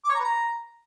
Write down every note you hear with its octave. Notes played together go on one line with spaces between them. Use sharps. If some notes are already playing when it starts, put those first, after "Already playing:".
D6
C#5
A#5
B4
A#5